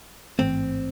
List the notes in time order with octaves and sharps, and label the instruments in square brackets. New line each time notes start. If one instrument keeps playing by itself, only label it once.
[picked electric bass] A1 G#2 E3 A3 [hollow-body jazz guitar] C4